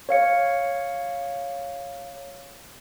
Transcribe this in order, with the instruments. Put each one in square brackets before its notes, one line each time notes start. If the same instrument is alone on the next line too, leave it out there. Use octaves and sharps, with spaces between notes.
[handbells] C#5 F5 C#7